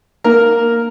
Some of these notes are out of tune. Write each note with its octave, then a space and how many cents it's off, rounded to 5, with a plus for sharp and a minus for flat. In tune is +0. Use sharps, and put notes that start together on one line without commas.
A#3 +0 A#4 +0